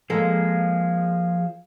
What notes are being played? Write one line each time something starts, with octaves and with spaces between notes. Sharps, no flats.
F3 G#3 A#3 G#4 A4